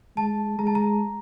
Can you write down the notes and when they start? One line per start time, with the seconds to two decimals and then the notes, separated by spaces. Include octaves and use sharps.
0.17 G#3 A5
0.59 G#3 A#5
0.67 A5
0.75 A#5